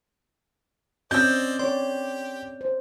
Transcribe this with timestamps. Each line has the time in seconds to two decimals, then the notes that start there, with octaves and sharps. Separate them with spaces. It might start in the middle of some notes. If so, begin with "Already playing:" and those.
1.11 C4 C#4 F#4 C5 D5 D#5 E6 G6
1.59 G4 C#5 D5 C6
2.61 C5